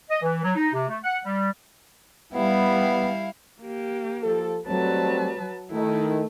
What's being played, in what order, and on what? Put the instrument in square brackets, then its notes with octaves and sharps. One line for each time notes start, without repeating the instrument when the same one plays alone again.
[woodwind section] D#5
E3
F#3
D#4
C3
A3
F#5
G3
[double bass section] G3 [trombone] B3 [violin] E4 F5
[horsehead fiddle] A#3 G4
[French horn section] F3 A4
[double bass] F#3 [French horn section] G3 A3 C4 [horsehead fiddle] B4 A5
[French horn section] D#3 [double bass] A3 [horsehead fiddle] E4